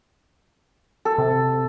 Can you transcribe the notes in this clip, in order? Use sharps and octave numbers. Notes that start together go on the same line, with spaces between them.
A4
C3